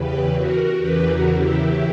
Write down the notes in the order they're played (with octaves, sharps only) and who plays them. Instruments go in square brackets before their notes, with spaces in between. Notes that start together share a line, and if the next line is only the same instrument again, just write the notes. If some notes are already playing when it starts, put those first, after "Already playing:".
Already playing: [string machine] E2 C#3 E3 G4 B4
F#4 A#4
E2 C#3 E3 G4 B4
F#4 A#4
E4 G4